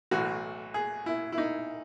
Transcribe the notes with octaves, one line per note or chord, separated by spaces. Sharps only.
B1 A2 E3 F#4
G#4
E4
E4
D#4